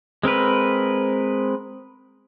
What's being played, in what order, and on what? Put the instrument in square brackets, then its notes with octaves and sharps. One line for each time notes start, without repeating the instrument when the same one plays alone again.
[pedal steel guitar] G#3 C4 A#4 B4